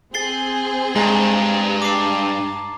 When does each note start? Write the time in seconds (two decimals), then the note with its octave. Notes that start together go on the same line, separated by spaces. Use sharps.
0.14 C4 G#4 A6 C7 G7
0.96 G2 G#3 A#5
1.82 A5 D6 C7